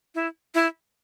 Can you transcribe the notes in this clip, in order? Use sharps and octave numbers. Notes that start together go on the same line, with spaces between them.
E4
E4